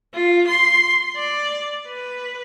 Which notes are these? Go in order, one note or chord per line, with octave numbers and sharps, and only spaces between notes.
F4
C6
D5
B4